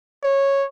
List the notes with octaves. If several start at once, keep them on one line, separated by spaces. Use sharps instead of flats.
C#5